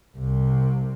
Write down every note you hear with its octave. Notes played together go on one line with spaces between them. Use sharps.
C2 C3